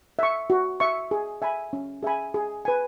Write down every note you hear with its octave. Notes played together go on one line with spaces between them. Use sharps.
E5 C#6
F#4
E5 C#6
G#4
E5 G#5 B5
C#4
G#4 E5 G#5 B5
G#4
B4 G#5